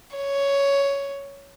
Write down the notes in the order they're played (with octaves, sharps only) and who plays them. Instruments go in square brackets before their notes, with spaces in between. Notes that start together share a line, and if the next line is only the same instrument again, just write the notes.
[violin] C#5